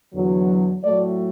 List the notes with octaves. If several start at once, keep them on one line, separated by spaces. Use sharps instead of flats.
E2 D3 F#3
A2 F#3 A3 D5